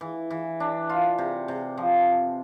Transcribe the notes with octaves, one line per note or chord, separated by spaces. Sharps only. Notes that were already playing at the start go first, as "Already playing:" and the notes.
E3
E3
D4
F4
C3
C3
F3